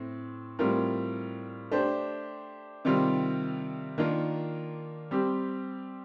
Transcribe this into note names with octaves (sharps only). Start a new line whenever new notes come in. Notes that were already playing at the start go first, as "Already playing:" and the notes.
Already playing: A2 C4
A2 G3 C4 F4 A#4
A3 D4 G4 C5
C3 D#3 G3 C4 F4
D#3 A#3 D4 F4 A#4
G3 C4 G4